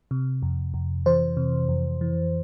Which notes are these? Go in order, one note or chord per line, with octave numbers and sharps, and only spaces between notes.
C3
F2
F2
E3 C5
C3
F2
E3